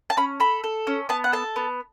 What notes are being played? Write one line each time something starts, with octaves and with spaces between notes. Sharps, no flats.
A5
C#4 B5
A4 B5
A4
C#4
B3 A5
F#5
A4 A5
B3